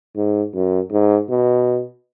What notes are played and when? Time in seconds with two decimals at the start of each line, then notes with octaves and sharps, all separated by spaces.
0.16 G#2
0.54 F#2
0.92 G#2
1.29 B2